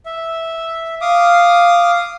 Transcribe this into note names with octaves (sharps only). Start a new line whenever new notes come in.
E5
F5 D6 D#6